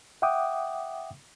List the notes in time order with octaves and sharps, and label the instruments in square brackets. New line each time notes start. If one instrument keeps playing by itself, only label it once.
[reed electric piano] E5 F#5 G5 D6 D#6